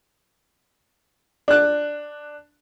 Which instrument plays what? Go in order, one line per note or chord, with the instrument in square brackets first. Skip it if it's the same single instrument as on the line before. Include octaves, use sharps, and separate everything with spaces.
[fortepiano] D4 F#6